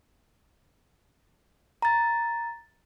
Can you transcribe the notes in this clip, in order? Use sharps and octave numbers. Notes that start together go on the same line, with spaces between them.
A#5 A6